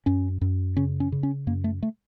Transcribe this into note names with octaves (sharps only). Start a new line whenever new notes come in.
F#2 C#4
F#2
C#3 C#4
C#4
C#3
C#4
F#2 A#3
A3
A3